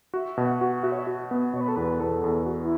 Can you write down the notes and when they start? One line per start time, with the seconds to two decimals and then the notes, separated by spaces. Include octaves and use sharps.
0.14 F#4 E5
0.37 B2
0.45 F#5
0.61 F#4
0.76 F#5
0.83 F#4 E5
0.92 C#5
0.99 E5
1.07 F#4
1.31 B3
1.53 B2 C#5
1.61 B4
1.68 A4
1.76 E2 B4
2.00 E2 A4
2.24 E2
2.46 F#4
2.62 E4